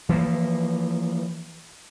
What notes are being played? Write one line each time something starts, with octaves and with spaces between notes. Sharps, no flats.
E3 F3 G#3 A#3